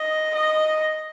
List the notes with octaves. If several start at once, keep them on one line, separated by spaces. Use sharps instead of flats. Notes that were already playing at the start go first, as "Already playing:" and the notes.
Already playing: D#5
D#5